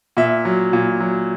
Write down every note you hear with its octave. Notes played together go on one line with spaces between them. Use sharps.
A#2 E5
F#3
A#2
F#3